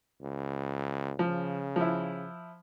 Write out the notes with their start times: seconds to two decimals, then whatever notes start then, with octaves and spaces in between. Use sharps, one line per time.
0.22 C#2
1.19 C#3 F3
1.76 F3 E4